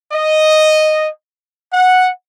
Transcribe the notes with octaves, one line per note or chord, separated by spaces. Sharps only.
D#5
F#5